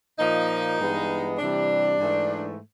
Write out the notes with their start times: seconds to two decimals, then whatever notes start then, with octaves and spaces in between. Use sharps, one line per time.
0.19 A#2 F3 A#3 D#4
0.79 G2 E3 G#3 B3
1.39 C3 E3 G3 D4
1.98 G#2 E3 A3